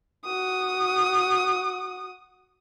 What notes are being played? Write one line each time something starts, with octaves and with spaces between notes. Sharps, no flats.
F#4 D#6